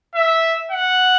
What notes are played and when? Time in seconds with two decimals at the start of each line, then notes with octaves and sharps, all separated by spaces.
0.15 E5
0.71 F#5